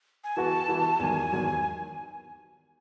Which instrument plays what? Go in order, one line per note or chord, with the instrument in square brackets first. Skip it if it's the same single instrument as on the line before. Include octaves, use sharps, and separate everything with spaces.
[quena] G#5
[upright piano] E3 B3 F#4 [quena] A5
[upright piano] E3 B3 F#4
[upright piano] E2 D#3 F#3 [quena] G#5
[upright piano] E2 D#3 F#3